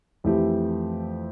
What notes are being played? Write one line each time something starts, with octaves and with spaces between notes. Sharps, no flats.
F2 E3 A3 E4 G4